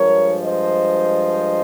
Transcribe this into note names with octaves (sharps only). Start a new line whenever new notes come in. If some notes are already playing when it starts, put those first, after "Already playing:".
Already playing: G2 F3 G#3 A#4 C#5
C5 D#5